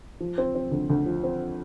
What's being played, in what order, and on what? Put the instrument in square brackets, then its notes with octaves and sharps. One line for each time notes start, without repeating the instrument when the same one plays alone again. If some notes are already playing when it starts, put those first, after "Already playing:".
[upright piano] F3
C4
C4
D2
D2
F3
C4